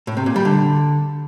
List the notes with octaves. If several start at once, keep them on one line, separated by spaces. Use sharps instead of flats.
A2
C3
A#2
G3
D3